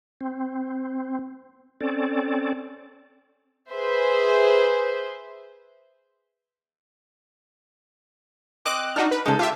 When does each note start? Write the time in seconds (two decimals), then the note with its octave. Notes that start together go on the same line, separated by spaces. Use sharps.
0.21 C4
1.81 C4 C#4 A4 D5
3.70 G#4 B4 C5 E5
8.65 C4 D#5 D6 E6 F#6
8.96 D4 D#4 F#4 F6
9.11 B4
9.26 C#3 G#3 D#4 A4
9.39 F4 G4 E5 F5